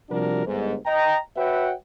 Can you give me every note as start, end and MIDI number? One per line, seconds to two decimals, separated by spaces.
0.10 0.45 48
0.10 0.45 53
0.10 0.45 55
0.10 0.45 62
0.10 0.45 66
0.10 0.45 70
0.46 0.74 31
0.46 0.74 44
0.86 1.17 75
0.86 1.17 79
0.86 1.17 82
1.36 1.72 66
1.36 1.72 71
1.36 1.72 73
1.36 1.72 76
1.36 1.72 78
1.36 1.72 79